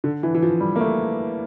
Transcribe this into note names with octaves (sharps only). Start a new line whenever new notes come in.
D3
E3
E3
F3
G3
A#3
A3